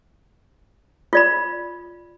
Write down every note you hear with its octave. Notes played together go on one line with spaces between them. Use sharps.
F4 D5 B5